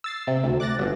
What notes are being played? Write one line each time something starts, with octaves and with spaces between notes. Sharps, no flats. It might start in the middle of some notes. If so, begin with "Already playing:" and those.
E6 A6 C7
C3
D2
D6 F#6 A6 A#6
G1 B2